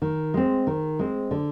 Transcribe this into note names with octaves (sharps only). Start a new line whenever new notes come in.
D#3
G#3 C4
D#3
G#3 C4
D3